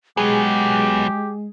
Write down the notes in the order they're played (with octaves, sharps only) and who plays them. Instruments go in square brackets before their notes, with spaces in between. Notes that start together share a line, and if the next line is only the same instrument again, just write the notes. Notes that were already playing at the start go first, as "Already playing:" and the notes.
[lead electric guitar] F#3 B3 [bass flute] G#3 [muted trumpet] G4 [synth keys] G#4